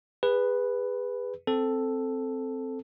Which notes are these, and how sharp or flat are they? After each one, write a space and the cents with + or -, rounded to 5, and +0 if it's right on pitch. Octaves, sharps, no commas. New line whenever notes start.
G#4 -30 B4 +0
C4 +0 A4 +0